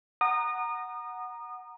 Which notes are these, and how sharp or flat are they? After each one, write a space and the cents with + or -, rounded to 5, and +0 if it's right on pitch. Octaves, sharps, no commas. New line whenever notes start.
F#5 +0 A#5 +0 D#6 -30